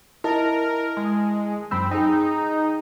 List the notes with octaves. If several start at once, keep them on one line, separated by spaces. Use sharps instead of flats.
E4 A#4 D#5 A5
G#3
F#2 C4 B5 E6
D#4 G#4 G5